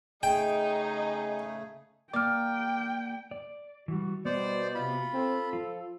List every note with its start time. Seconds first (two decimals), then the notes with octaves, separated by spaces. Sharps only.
0.23 C#3 A3 D#4 G#4 D#5 G5
2.13 A#3 D5 G5 D6 F6
3.31 D5
3.88 E3 G3 F#4
4.25 B2 G3 B3 C5 D5
4.75 C3 F4 B5
5.13 C4 A4
5.53 F3 F4